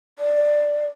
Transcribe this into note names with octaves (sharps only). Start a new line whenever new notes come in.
D5